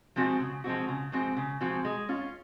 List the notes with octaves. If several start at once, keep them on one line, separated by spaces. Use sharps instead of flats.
F3 G#3 C4 F#4
C#3
F3 G#3 C4 F#4
C#3
F3 G#3 C4 F#4
C#3
F3 G#3 C4 F#4
G#3
C#4 F4